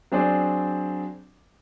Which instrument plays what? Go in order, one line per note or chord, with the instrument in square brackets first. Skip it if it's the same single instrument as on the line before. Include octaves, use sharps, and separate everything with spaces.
[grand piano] F#3 C4 D4 G#4 C5 D5